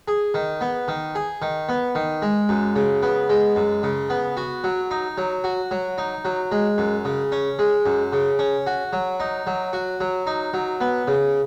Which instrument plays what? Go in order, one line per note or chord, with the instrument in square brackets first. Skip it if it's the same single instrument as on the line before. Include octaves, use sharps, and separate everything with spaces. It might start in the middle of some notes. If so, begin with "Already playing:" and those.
[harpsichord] G#4
D#3
B3
D#3
G#4
D#3
B3
D#3
G#3
F#2
C#3
B3
G#3
F#2
C#3
B3
F#4
F#3
D#4
F#3
F#4
F#3
D#4
F#3
G#3
F#2
C#3
C#4
G#3
F#2
C#3
C#4
F#4
F#3
D#4
F#3
F#4
F#3
D#4
F#3
B3
C#3